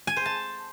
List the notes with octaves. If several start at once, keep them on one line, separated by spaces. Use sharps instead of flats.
G#5
C5
A5